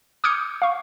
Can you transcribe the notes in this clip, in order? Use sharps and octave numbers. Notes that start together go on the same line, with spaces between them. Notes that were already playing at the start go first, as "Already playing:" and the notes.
D6 D#6 F6 G6 G#6 C#7
F5 C#6